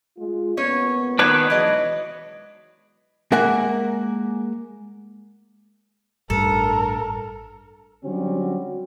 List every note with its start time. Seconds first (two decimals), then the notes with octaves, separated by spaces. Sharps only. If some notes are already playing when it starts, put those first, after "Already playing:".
0.17 G#3 F4
0.57 F2 A#3 B3 C#4 C#5
1.19 D#3 D4 D#4 F#4 B4 C#5
1.50 B2 E3 F#3 G#3 D#5
3.32 G#3 A#3 A#4 E5 F#5 G#5
6.30 A1 G2 A4 A#4
8.05 D3 F#3 G3 C4 C#4 F#4